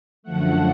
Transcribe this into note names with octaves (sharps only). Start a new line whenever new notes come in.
F#2 D3 F3 A3 F#5